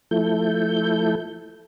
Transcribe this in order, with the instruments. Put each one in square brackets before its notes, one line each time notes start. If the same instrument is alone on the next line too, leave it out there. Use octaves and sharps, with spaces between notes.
[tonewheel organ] F3 A3 E4 A4 G6